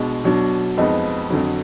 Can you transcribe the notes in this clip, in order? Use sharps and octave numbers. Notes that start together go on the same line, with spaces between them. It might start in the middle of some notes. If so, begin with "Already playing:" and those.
Already playing: B2 G#3 D4
B2 F#3 D4
F2 F3 G#3 B3 D#4 D#5
F2 D3 F#3